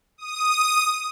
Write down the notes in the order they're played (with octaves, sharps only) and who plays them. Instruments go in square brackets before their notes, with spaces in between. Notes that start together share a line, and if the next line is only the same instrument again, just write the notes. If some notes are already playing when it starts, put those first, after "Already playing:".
[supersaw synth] D#6